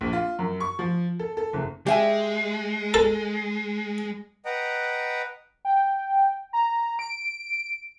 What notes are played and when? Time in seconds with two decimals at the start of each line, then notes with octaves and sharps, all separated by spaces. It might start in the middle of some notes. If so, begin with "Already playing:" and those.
0.01 A#1
0.13 F4
0.39 F#2
0.60 C#6
0.79 F3
1.19 A4
1.37 A4
1.53 F#1
1.86 G#3 G4 E5 G#5
2.94 A4
4.45 B4 D#5 F#5 G5 A#5
5.65 G5
6.53 A#5
6.99 D7